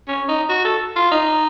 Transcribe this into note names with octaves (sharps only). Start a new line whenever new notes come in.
C#4
D#4
F#4
A4
F4
D#4